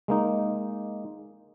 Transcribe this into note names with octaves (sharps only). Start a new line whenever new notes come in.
G#3 A#3 D#4